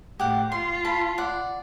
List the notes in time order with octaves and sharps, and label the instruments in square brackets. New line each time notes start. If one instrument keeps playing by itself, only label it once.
[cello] A2 [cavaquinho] G4 F#5
[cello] F4 [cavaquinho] C6
[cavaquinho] A5 B5
D5 F#5